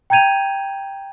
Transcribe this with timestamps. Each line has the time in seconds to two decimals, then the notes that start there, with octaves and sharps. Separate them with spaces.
0.10 G5 A#5 G6 G#6 D#7 F7